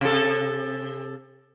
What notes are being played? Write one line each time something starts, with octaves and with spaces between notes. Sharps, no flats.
C3 A4